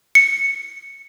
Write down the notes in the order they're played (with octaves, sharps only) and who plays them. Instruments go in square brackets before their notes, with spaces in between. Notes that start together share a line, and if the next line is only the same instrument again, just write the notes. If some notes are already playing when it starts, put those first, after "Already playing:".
[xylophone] C#7